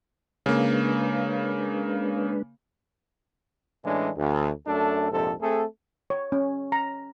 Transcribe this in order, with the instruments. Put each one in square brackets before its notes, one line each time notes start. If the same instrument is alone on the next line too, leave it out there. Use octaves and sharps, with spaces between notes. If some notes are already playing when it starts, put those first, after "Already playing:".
[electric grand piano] C#3 A#3 [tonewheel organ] G#3 D4 B4
[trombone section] A2 E3 G#3 C#4 D4
D2
F#2 A3 D4 A4
A#1 F2 G#2 C3 G4 A4
A3 C4 G#4 A4
[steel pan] C#5
C#4
A#5